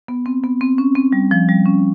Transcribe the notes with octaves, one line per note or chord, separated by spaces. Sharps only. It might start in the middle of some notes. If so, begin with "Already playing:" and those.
B3
C4
B3
C4
C#4
C4
G3
F3
G3
C#4